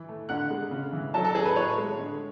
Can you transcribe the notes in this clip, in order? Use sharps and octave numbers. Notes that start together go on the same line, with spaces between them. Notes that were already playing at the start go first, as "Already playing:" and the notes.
Already playing: E3
A3
D3 F#5 F#6
G#3
C#3
E3
F#3 A4 A5
A4 A5
C#4 G#4 G#5
B4
A2 C#5
G#3
D3